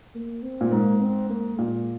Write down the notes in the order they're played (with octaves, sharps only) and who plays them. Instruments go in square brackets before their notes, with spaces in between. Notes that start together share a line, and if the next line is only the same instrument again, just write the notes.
[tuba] A#3
C4
[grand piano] A#2
[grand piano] G#2 [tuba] A#3
[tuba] C4
A#3
[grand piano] A#2 [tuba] G#3